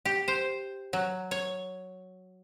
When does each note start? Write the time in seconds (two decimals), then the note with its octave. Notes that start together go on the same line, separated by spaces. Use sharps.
0.05 G4
0.28 C5
0.93 F#3
1.31 C#5